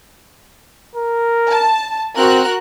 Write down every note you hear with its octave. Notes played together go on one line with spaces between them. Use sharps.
A#4
A5
C4 F#4 A#4 F#6